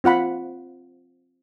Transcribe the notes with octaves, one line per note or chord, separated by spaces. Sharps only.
C4 F4 F#5 B5